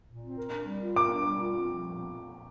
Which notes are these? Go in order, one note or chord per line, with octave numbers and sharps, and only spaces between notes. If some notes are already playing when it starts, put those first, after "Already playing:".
A#2
C4
A#4
D4
G3
F4
A#4 D6
D4
G3
F4
C4
F3
A#2